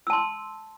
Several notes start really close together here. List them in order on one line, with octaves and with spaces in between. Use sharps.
E6 A5 C6